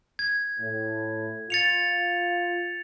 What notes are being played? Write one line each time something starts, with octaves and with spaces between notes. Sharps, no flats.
G#6
A2
F4 A6 C#7 F7